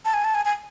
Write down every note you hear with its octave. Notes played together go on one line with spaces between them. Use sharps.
A5
G#5
A5
G#5
G#5